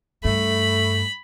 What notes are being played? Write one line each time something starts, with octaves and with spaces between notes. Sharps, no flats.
G2 A3 B5